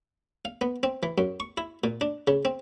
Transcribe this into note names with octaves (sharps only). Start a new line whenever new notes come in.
F5
B3
C4
E3
F#2
C#6
E4
A#2
D4
C#3
C4